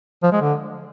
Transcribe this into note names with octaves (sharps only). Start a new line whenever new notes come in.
F3
G#3
D3